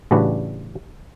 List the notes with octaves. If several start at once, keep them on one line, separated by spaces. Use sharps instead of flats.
A1 C#3 G3 D4 F#4 B4